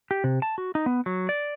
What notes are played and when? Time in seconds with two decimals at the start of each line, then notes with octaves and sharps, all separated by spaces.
0.11 G4
0.24 C3
0.42 A5
0.58 F#4
0.75 D#4
0.86 B3
1.06 F#3
1.29 D5